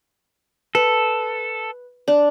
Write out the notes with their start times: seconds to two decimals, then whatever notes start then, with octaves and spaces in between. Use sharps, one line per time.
0.75 A4 B4
2.08 D4